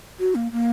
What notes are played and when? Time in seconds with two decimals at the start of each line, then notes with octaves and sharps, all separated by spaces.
0.20 F#4
0.35 A#3
0.52 A#3